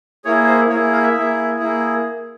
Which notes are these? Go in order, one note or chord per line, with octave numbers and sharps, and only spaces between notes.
A#3 E4 G#4 C#5
C5
A#3 E4 G#4 C#5
F5
E5
A#3 E4 G#4
A#3 E4 G#4